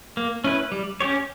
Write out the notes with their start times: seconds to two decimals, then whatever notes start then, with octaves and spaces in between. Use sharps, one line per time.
0.17 A#3
0.44 C#4 E4 B4
0.72 G3
1.00 C#4 G4 C#5